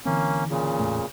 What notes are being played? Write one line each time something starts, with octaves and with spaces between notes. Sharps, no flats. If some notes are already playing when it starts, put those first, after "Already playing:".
D3 E3 A#3 C4 C#4
A#2 C#3
E2 A2 A3